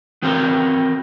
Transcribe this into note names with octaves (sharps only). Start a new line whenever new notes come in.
B3 C4 F#4 A#4 F5 G5